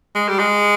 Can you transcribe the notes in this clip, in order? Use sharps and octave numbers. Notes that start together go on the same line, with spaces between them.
G#3
G3
G#3